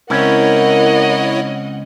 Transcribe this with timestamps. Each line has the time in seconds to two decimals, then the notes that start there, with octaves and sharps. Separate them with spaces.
0.10 C#2 C4 C#4 E4 A#4 C#5 D#5 F#5